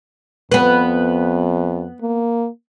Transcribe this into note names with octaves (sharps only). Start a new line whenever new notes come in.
F2 B3 B4
A#3